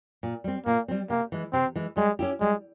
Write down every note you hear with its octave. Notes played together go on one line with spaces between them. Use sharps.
A#2
G3 C4
A#2 A#3
G3 C4
C3 A#3
E3 G#3
C3 C4
E3 G#3
G3 G#3
C#4 E4 G4
G3 G#3